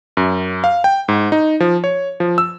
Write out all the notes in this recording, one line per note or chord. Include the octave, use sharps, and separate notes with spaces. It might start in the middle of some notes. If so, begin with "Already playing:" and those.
F#2
F5
G5
G#2
D#4
F3
C#5
F3
E6